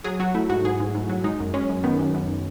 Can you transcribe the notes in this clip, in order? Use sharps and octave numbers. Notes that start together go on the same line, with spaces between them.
F#3 G#4
F#3 F#4
A3 E4
G#2 F#4
G#2 G#4
G#2
G#2
F#3
G#3 D#4
F#2
G#3 C#4
F#2
D#3 B3
F#2
F#2